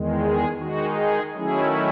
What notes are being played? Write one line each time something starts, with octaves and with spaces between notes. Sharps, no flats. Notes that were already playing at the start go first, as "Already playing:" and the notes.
Already playing: E2 D#3 G#3
G#4
D#3 G#3 D#4 F#4
G#4
D#3 F#3 A3 C#4 E4 G#4